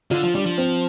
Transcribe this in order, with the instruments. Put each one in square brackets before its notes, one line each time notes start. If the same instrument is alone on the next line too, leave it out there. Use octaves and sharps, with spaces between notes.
[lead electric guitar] D3 [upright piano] F4
[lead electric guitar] F3
[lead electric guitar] G3 [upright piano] D4
[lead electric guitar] F3
[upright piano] C4